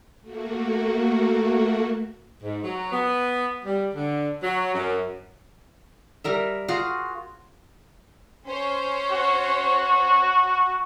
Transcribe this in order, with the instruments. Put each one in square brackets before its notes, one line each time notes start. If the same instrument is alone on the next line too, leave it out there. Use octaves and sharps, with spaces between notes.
[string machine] A3 A#3 F#4
[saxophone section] G#2
F#3
B3
G3
D3
F#3
F#2
[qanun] G3 A#4 E5
F4 F#4 G#4
[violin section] C#4 C5 C#5
[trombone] F#4